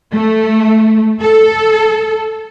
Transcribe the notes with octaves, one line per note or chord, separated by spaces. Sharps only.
A3
A4